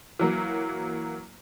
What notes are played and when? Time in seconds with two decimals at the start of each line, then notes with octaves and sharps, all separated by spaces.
0.19 E3 F#3 A#3